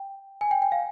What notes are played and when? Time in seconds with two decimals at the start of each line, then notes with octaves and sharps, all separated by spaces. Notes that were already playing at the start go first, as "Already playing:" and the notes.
Already playing: G5
0.41 G#5
0.51 G5
0.62 G5
0.72 F5